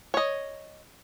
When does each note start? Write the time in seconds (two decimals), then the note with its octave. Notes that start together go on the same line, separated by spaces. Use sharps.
0.14 C#5 D#5